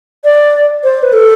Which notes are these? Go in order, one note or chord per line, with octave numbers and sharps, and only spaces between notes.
D5
C5
B4
A4